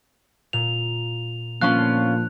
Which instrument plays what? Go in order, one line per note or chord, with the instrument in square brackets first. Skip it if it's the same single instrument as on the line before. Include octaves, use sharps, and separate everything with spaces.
[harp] A#2 [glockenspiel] F7
[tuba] A#2 [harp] F3 D4 [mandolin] B3 C#4 F4 [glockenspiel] F#6